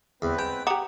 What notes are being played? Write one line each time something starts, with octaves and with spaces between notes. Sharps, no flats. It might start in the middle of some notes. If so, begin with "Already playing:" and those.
E2 B3 C4 B4
G#3 G5
G4 F#5 A#5 D6 D#6